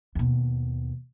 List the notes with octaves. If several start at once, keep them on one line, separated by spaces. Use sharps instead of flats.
D#2 B2